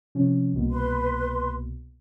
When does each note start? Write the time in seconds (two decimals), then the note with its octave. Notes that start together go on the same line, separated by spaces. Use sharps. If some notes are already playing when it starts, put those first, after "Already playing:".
0.15 C3 F3 C#4
0.53 C2 B2 A#3
0.71 B4 C6